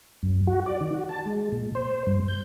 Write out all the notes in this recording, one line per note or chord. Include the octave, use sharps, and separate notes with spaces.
F#2
F#4
D5
D#3
F#4
A5
G#3
A#2
C5
G2
G6